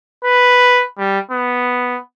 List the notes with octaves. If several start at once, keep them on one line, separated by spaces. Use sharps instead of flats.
B4
G3
B3